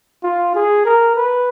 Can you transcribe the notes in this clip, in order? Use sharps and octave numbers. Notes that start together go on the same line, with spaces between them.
F4
G#4
A#4
B4